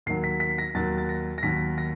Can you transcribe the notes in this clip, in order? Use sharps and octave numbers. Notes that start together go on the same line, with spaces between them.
D#2 D#3 F#3 C7
B6
B6
A#6
D#2 D#3 F#3 A6
A6
A#6
A#6
D#2 D#3 F#3 B6
A#6